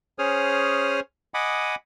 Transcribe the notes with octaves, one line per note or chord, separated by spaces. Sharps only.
C#4 G#4 C5 C#5 D#6 F6
D#5 F#5 G#5 B5 D6 D#6